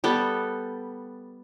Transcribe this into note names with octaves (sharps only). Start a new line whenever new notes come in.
G3 B3 A4